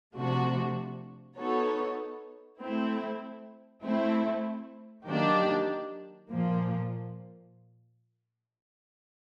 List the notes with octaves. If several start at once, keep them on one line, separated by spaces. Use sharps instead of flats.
C3 F3 A3 D4 F#4
B3 D#4 F#4 A4 C#5
A3 C4 E4
A3 C4 E4
D#3 F#3 A#3 D4 G4
A#2 F3 A#3